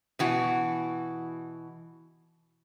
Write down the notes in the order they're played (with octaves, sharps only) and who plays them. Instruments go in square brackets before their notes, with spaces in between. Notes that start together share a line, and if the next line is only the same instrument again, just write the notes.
[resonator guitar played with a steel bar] B2 E3 F#4